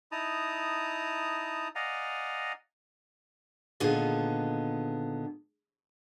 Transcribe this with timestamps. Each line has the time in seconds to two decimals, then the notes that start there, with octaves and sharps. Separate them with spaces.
0.12 D#4 E4 A5 A#5 D#6
1.75 D5 D#5 F5 F#5 G#5 A#5
3.80 A#2 D3 D#3 B3 G#4 D#5